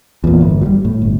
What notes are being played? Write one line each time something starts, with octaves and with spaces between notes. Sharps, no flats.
E2 A#2
G1
F#3 G3
A2
G1